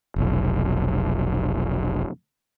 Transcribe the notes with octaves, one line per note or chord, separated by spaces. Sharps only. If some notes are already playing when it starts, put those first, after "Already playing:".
F1 B1